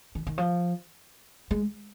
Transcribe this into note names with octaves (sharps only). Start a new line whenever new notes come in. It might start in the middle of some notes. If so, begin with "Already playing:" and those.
D#3
D#3
F3
G#3